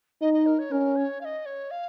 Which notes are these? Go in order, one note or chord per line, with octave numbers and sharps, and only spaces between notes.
D#4 D#5
D#5
A#4
C#5
C#4 A#4
C#5
F5
D#5
C#5
F5